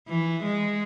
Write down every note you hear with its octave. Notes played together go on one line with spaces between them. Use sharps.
E3
G#3